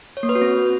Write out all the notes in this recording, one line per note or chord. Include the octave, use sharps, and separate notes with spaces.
C#5
A#3
B4
F#4
C4